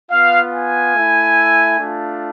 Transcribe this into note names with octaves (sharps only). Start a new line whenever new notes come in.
B3 F4 F5
G#5
A3 E4
A3 D4 F4